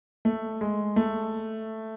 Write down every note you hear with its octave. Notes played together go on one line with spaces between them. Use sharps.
A3
G#3
A3